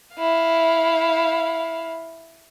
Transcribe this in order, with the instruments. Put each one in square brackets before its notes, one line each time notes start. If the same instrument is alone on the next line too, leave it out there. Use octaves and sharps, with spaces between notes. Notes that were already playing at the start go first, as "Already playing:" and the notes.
[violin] E4 F5